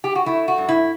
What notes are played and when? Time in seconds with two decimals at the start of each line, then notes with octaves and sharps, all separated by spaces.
0.04 G4
0.15 F#4
0.26 A3 E4
0.48 F#4
0.58 G2
0.69 E4